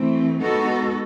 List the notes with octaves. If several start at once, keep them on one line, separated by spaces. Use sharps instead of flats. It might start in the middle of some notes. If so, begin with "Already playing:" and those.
Already playing: E3 A3 C4
G#3 B3 D#4 F#4 A4